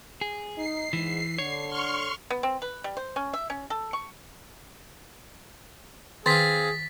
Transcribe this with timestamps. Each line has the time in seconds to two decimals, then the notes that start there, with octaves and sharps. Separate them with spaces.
0.21 G#4
0.57 D#4 C7
0.93 G#2 E3
1.38 D3 C#5
1.68 C6 C#6 F6
2.30 B3
2.43 C4
2.62 B4
2.84 G3
2.97 C5
3.16 C#4
3.33 E5
3.50 C#4
3.70 A4
3.93 C#6
6.26 D#3 C4 F4 G#4 A6 B6